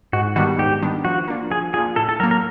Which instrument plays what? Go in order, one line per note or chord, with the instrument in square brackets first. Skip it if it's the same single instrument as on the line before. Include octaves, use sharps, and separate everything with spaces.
[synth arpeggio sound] G#2 [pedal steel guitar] F#4
[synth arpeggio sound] D#3 G3 B3 D4 [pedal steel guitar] F#4
[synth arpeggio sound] G#2 [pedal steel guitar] G4
[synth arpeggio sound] D#3 G3 B3 D4
[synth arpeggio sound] F3 [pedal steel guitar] F#4
[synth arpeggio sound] A#3 D4 F4
[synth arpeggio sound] F3 [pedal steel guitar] G#4
[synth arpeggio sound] A#3 D4 F4 [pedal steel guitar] G#4
[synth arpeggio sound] A2 [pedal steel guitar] A4
[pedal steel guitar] A4
[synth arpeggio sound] F#3 A#3 [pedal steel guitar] A#4
[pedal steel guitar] A#4